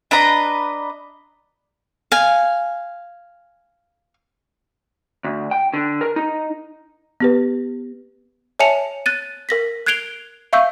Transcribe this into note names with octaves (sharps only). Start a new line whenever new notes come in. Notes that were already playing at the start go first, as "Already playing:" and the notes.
D4 B4 D#5 A#5
F5 G#5
D2
G5
D3
A#4
D#4
B3 G4 B4
C#5 E5 G#5 A5 C#7 F7
F#6 A6 D#7
A#4 A#6 B6
F#6 G#6 C7 D7 F7 G7
E5 F5 C#6 E6 G6